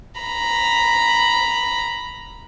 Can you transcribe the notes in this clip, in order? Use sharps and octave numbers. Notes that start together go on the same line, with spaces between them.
A#5 B5